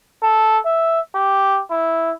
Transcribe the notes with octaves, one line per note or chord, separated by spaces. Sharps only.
A4
E5
G4
E4